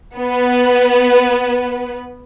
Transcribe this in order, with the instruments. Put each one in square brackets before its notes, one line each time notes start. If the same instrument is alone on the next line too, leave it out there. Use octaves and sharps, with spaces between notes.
[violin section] B3 B4